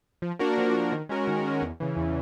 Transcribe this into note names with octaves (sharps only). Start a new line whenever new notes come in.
F3
A#3 D4 F#4 A#4
F3
A#3 D4 F#4 A#4
D#3
G#3 C#4 F#4 A#4
D#3
G#3 C#4 F#4 A#4
E2
C#3 E3
E2